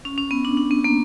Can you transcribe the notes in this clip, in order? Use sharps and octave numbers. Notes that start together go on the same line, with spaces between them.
C#4
C#4
B3
D4
D4
B3
A#3